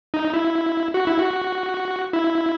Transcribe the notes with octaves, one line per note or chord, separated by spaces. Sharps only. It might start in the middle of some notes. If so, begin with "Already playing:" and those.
D#4
E4
F#4
E4
F#4
E4